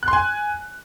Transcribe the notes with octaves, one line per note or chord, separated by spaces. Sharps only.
F#6
C6
G#5